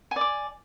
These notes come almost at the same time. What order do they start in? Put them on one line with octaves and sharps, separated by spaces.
G#5 D5 D6